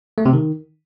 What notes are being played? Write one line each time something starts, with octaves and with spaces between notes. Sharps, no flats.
A3
C3
D#3